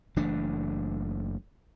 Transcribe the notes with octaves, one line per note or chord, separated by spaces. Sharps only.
F#1 E3 A3 D4